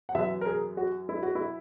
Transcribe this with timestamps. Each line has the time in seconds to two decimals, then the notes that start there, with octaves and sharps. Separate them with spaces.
0.09 F#5
0.15 F#2 E3 E5
0.41 A#4
0.46 G#4
0.77 F#4
1.09 E4
1.23 F#4
1.35 E4